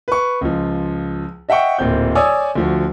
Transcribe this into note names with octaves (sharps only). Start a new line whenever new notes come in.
B4 C#6
C#2 F3
D#5 E5 F#5 G5 C#6
D1 A#2 C4 G6
C#5 D5 G#5 D#6 E6
D2 F3 F#4